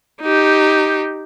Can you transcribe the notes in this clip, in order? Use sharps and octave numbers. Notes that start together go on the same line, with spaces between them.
D#4 G4